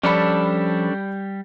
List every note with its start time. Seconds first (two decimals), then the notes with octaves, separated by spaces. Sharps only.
0.03 F3 G3 C#4 D4 A4 D5 B5